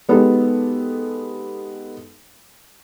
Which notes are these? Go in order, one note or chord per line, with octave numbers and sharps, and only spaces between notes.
G#3 B3 D#4 G4 A4